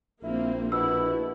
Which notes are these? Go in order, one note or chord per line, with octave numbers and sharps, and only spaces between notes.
A#1 A#3 C4 E4
B2 E4 E6